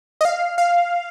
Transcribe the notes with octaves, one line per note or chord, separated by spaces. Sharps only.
D#5
F5
F5